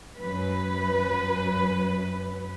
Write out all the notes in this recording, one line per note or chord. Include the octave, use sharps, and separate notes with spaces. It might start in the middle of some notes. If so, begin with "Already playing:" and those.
F#2 B4